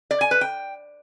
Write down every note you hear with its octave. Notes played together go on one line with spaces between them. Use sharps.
D5
G#5
B4
G5